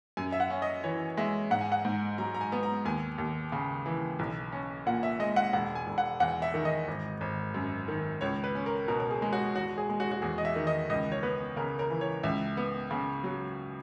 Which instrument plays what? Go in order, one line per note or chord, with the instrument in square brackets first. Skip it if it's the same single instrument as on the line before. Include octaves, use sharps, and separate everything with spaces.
[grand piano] F#2 G#5
E5
F#5
C#4
D#5
E3 C#5
G#3 E5
G#2 F#5
G#5
F#5
G#2
F#3 A#5
A#5
G#5
B3
A#5
D#2 G#5
D#2
C#3
E3
B1
C#4
A#2 F#5
E5
G#3 D#5
F#5
E1 F#5
G#5
E1
F#5
E2 F#5
E5
D#3
D#5
G#1
G#1
F#2
D#3
C#2 C#5
B4
C#4
A#4
B2 A#4
A#4
G#4
G#3
F#4
E1 F#4
G#4
G#3
F#4
F#4
E2 G#4
D#5
E5
D#3
D#5
C#2 D#5
C#5
B3 B4
C#3 A#4
A#4
E3
C#5
C#2 E5
B3
C#3
F#3